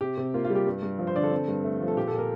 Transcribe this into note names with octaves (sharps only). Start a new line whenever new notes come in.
C3 G4
C3
A#3 F4
F4
G3
G4
G2
G2
F3
C5
D3 D5
A4
C4
G2
A3
F3
A4
A#2 G4
A4
A#2
A#4